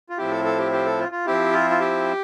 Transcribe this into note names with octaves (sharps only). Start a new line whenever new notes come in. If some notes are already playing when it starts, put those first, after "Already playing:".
F4
A2 F3 C4 E4 G4
A4
A4
G4
G4
A4
F4
F4
F3 C4 E4 G4
F4
F4
G4